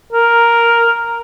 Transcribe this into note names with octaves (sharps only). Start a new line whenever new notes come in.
A#4